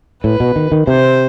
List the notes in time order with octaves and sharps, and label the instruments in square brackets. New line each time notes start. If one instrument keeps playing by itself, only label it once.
[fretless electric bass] A2 [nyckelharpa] B4
[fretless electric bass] B2
D#3
D#3
[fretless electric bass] C3 [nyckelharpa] C5